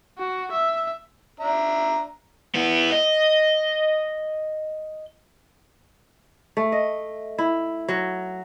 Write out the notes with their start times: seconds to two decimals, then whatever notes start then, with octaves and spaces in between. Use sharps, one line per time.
0.18 F#4
0.52 E5
1.40 D4 E5 A#5
2.55 B3 E4
2.92 D#5
6.57 A3
6.72 D#5
7.38 E4
7.88 F#3